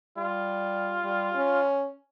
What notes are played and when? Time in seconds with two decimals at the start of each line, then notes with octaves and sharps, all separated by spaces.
0.17 G3 F4
1.05 G3
1.35 C#4